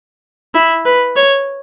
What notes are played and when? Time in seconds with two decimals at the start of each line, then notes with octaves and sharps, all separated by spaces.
0.54 E4
0.85 B4
1.16 C#5